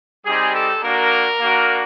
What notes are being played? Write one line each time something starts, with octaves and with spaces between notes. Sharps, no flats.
G3 C4 D#4 G4 G#4
A4
A#3 D4 F#4 A#4
A#3 D4 F#4